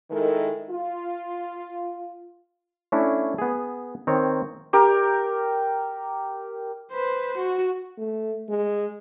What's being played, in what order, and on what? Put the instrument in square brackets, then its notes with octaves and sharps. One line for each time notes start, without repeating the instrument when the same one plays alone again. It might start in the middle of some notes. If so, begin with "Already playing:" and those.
[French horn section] D#3 G#3 E4 A4 A#4
F4
[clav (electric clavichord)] A3 C#4 D4 E4
B3 G#4
D#3 C4 C#5
[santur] G4 A#4
[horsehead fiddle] B4 C5
F#4
[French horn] A3
G#3